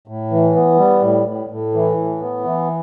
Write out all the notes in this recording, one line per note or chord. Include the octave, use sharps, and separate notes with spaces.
A2
E3
B3
G3
A2
A2
A2
E3
A2
B3
E3